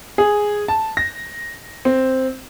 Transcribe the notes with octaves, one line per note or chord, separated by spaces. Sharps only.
G#4
A5
A#6
C4